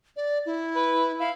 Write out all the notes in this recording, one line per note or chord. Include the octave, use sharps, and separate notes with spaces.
D5
E4
B4
E4 F5